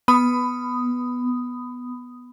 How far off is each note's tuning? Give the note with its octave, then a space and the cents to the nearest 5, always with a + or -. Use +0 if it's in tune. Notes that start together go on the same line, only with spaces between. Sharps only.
B3 +0 B5 +20 D#6 +0